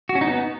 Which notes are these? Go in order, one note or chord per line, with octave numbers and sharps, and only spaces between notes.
F#4
C#4
D#4
B3